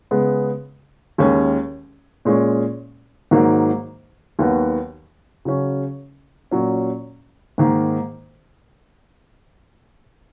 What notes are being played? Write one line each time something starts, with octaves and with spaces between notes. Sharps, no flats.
C#3 G#3 B3
D#2 D#3 G#3 C#4
A#2 G#3 C#4
G#2 D#3 F#3 A#3
D#2 D#3 F#3 B3 F#4
C#3 F#3 C#4
A#2 F#3 C#4
G#2 D#3 A#3